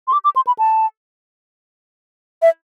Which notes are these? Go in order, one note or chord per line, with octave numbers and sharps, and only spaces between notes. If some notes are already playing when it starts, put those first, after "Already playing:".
C6
D6
D6
C6
B5
A5
E5